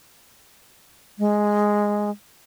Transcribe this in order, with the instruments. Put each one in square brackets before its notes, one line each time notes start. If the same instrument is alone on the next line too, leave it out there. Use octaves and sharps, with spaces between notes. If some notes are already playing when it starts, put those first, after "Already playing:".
[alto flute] G#3